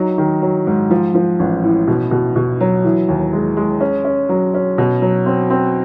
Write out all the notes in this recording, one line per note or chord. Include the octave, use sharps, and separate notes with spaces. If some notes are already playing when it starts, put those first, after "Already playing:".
Already playing: F#3 D#4
D#3
F#3
G#2
F3
F3
A1
A2
B2
B2
B2
F#3
E3
D#2
G#3
G#3
C#4
C#4
F#3
C#4
B2
F#3
C4
C4